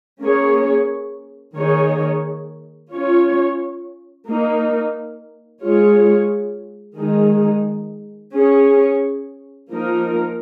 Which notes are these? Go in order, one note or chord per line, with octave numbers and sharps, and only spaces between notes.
A#3 C#4 G#4 C#5
D#3 A#3 D#4 G#4 C#5
C#4 F4 C#5
A#3 D#4 A#4
G#3 F4 G#4 C#5
D#3 G#3 D#4 G#4
C#4 G#4 C#5
F3 A#3 D#4 A#4